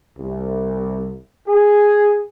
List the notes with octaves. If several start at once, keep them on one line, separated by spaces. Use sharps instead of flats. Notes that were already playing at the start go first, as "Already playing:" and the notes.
C2
G#4